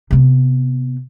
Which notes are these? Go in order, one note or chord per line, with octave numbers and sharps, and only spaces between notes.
C3 B3